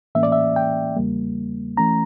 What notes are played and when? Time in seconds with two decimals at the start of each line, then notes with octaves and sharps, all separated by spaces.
0.15 A2 E3 A#3 C#4 E5
0.23 D5
0.32 E5
0.56 G5
0.96 E2 C#3 G3 A#3
1.77 E3 A3 C#4 A#5